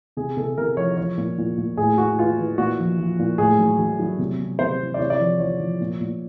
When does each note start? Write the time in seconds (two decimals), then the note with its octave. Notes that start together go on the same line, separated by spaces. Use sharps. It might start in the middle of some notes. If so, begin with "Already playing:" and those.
0.17 C3 G#4
0.37 C3 A4
0.58 C3 A#4
0.77 F3 C#5
0.97 F3 C#5
1.18 A#2
1.38 A#2
1.57 A#2
1.77 A2 G#4
1.98 A2 F#4
2.18 E3 F4
2.38 E3
2.58 A#2 F#4
2.79 F3
2.99 F3
3.19 A#2
3.38 A2 G#4
3.59 F#3
3.79 F#3
3.99 F#3
4.19 C3
4.39 C3
4.59 C3 C5
4.79 E3
4.94 D5
4.99 C3 C#5
5.10 D5
5.19 F3 C#5
5.39 F3 C#5
5.60 F3
5.81 A#2
6.01 A#2